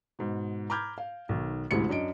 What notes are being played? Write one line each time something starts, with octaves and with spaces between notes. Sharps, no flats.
G#2 B2
A#5 B5 D6 F6 G6 G#6
F5
B1 D#3
A1 D2 C3 G#3 E4 C#7
F#2 D4 D#5 D7